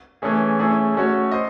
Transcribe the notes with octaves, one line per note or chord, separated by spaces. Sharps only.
E3 A3 C#4 G#4
A3 C#4 E4 G#4
A3 C#4 F#4 C#5
C5 D#5